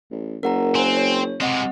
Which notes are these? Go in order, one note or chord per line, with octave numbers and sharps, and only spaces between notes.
A1
F#1 A#4 F#5 A#5
C4 C5 G#5
C#5
C3 G#3 C4 D#5 F#5